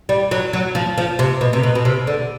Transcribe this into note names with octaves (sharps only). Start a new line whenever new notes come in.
G3
F#3
F#3
F3
F3
C3
B2
C3
B2
B2
C3
D3